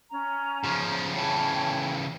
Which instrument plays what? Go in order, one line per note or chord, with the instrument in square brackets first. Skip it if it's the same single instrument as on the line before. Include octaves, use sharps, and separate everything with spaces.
[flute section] C#4 A#5
[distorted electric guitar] C#3 F3
[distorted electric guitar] C#3 E3 [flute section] C#5 G5 A5